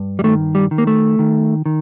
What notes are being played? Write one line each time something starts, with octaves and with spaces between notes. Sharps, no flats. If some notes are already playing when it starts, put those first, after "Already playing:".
Already playing: G2
G3
D#3 A3
G3
D#3
A#3
A3
D#3
D#3